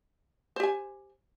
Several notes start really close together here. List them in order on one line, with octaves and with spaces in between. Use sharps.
C5 G4 G#5